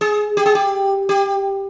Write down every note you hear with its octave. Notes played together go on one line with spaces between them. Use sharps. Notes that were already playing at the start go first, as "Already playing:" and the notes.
G#4
G4
G#4
G4
G4